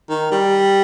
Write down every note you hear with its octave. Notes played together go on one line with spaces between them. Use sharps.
D#3
G3